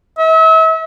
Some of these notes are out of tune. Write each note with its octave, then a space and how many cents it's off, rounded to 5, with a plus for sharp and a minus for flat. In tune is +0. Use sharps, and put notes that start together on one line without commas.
E5 -35